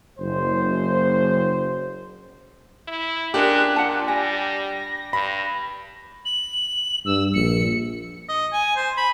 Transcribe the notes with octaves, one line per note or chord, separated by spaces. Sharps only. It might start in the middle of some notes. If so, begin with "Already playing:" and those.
F#1 C5
E4
G#3 C#4 D4 F4 G4 A#4 F#6
A#2 F4 F#5 A5
G3 G#5 A#6
G2 B5
F#7
G2 E6
A#1 C#7
D#5
G#5
C5
B5